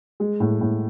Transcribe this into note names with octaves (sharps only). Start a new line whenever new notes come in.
G#3
A2
A2